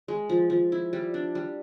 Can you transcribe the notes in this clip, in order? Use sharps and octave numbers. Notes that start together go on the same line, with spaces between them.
G#3
F3
F3
E4
G3
D4
G3